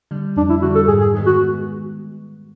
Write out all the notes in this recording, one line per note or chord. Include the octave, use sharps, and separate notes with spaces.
D3 G3
F2 D4
E4
D3 G3 F#4
A4
G#2 G#4
G#4
D#3 G#3 B3
F#4